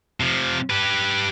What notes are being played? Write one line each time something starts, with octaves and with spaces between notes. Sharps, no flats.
C3 F3
G4 B4